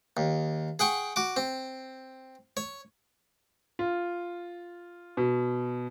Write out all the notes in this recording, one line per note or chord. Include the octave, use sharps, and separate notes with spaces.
D#2
G#4 F#5 G5 C#6
F#4 D6
C4
C#5
F4
B2